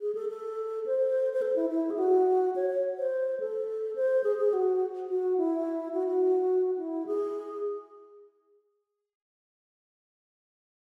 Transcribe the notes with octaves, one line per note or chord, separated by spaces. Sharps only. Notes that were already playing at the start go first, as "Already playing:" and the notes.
G#4
A4
A4
C5
C5
A4
E4
E4
G#4
F#4
C#5
C#5
C5
A4
C5
G#4
G#4
F#4
F#4
E4
F#4
F#4
E4
G#4